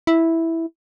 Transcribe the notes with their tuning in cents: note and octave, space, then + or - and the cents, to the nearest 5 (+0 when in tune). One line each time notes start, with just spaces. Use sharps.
E4 -5